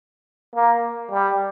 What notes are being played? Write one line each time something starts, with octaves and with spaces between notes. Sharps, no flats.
A#3
G3